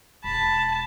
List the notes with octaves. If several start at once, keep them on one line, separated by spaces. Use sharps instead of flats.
E1 A5 B5